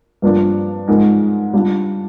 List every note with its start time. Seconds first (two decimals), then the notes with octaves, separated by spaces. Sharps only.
0.22 G2 F3 A#3 D4
0.88 G#2 F3 G#3 D#4 A#4
1.53 G3 D4 F4